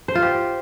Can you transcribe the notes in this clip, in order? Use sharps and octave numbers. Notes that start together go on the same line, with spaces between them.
C5
F4
G4